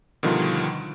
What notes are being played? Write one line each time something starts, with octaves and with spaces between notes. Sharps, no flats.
B2 D3 D#3 F3 G3 F4